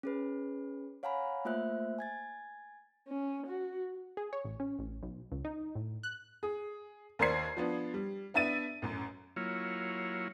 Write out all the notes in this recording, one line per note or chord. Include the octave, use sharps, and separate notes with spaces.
C#4 G#4 B4
C#5 F5 F#5 G#5 A#5 B5
A3 A#3 F4 C5 E5 F#6
G#5 G#6 A6
C#4
F#4
G#4
C#5
A1
C#4
A1
B1
C#2
D#4
A2
F#6
G#4
D#2 A#4 C5 D5 G#6 C7
F3 B3 D4
G3
B3 D4 E5 A6 D#7
A1 F#2
F#3 A#3 E4 F4 C#5